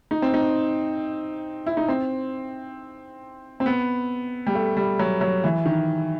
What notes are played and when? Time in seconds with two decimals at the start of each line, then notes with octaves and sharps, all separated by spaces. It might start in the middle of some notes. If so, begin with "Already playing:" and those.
0.11 D#4
0.22 C4
0.34 D#4
1.66 E4
1.77 D#4
1.88 C4
3.60 C4
3.66 B3
4.47 G3
4.55 A3
4.77 G3
4.99 F#3
5.21 F#3
5.44 E3
5.65 D#3